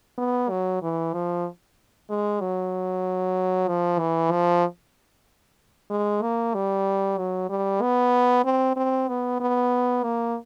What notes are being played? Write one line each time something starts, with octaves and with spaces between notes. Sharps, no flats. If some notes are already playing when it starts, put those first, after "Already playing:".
B3
F#3
E3
F3
G#3
F#3
F3
E3
F3
G#3
A#3
G3
F#3
G3
B3
C4
C4
B3
B3
A#3